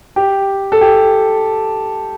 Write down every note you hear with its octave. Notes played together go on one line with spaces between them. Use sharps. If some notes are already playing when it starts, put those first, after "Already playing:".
G4
A4
G4